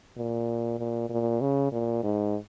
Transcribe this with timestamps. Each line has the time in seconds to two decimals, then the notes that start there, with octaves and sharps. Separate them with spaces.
0.17 A#2
0.79 A#2
1.10 A#2
1.41 C#3
1.72 A#2
2.03 G#2